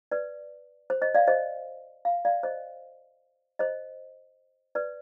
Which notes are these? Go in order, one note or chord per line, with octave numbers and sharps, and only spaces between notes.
B4 D5
C5
C5 D#5
D5 F5
C5 D#5
F5
D5 F5
C5 D#5
C5 D#5
B4 D5